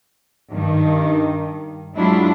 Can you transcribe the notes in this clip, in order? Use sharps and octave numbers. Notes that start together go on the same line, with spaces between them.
G2 D#3
F#3 G#3 D4 E4 F4